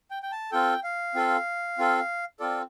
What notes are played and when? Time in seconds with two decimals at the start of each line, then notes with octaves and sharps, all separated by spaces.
0.11 G5
0.23 G5
0.32 A5
0.52 C4 F4 A4 G5
0.84 F5
1.15 C4 F4 A4
1.78 C4 F4 A4
2.40 C4 F4 A4 D5